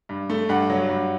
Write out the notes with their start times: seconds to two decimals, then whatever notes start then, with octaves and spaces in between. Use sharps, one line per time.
0.09 G2
0.30 A3
0.49 G2 F#5
0.70 F#3
0.89 G2